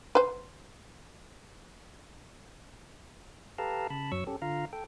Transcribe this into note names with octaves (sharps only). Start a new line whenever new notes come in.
B4 C5
G4 A4 B4 F5 A5 A#5
C#3 A5 B5
F#2 F#3 C#5 C#6 E6
C#4 G4 A4
D3 F4 F5 A#5
A4 G5